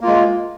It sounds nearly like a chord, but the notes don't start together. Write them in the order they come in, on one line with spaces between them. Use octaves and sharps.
A#3 F4 G#3